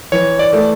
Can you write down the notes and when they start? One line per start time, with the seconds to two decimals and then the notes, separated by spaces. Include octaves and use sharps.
0.12 E3 C#5
0.39 D5
0.53 A3